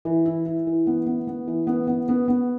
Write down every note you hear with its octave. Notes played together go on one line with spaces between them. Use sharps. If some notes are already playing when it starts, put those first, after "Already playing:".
E3
E4
E4
E3
B3
B3
B3
E3
B3
B3
B3
B3